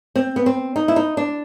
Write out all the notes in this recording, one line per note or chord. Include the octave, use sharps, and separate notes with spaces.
C4
B3
C4
D#4
E4
D#4
D4